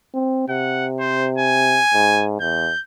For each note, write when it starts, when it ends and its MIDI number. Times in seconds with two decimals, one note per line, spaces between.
0.14 0.47 60
0.49 1.80 48
0.49 0.86 78
1.00 1.28 72
1.38 2.25 80
1.94 2.38 44
2.41 2.71 40
2.41 2.81 91